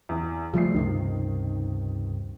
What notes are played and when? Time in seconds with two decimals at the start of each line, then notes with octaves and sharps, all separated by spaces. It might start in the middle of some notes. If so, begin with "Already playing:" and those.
0.09 E2
0.54 C#3 F3 G3 A3 C7
0.74 C#2 G2 C3 D#3